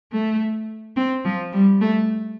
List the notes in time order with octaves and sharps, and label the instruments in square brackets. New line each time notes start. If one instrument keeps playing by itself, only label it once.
[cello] A3
C4
F3
G3
A3